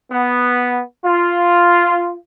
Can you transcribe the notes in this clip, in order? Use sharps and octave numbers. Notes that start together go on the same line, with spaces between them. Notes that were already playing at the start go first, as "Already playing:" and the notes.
B3
F4